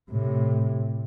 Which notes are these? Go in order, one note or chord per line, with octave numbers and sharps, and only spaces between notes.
A2 C3